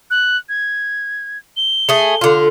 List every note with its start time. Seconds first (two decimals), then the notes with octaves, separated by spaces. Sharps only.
0.11 F#6
0.49 G#6
1.57 G7
1.89 A3 G#4
2.21 D3 F4